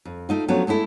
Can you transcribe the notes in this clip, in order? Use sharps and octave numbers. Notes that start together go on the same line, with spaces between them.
F2
A3 D#4 F4
F3 F#3 A3 B3 C#4 D4
G#3 A3 D4 E4 A4